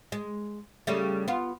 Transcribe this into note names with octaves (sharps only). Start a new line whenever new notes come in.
G#3
C#3 G3 A3
B3 F4